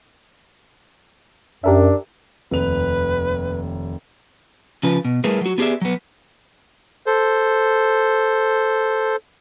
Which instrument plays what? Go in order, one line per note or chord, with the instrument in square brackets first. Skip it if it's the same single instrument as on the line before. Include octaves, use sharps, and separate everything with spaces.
[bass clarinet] F#2 [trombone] D4 [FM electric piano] G4 A#4 E5
[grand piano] F1 D#2 F7 [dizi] B4
[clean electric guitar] C#3 F3 B4
B2
G3 A3 E4 G#4 A#4 B4
F#3 F#4
B3 G4 G#4 B4 D5 E5
F#3 B3
[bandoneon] A4 C5